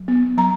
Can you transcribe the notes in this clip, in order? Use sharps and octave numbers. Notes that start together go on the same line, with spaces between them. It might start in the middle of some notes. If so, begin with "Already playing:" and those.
Already playing: F#3
B3
F#3 A#5